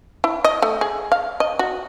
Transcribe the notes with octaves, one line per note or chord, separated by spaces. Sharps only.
E4
D#5
A3
G#4
F5
D#5
F#4